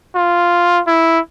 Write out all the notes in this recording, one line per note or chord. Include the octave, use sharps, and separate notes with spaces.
F4
E4